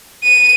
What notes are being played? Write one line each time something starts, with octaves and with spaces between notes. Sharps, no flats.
D#7